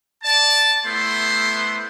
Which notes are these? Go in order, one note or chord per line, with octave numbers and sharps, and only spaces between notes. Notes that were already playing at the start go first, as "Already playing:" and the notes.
D5 A5
A3 B3 E4 C5 C6